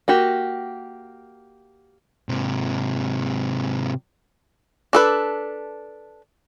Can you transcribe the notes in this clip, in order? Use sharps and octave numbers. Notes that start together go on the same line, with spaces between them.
A#3 F#4 G4
G#2 C3
D4 A4 B4